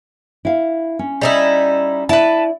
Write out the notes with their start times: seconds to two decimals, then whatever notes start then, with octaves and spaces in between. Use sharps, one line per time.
0.45 E4 F5
0.99 C#4
1.21 G3 D#4 E4
2.09 E4 B4 D5 A5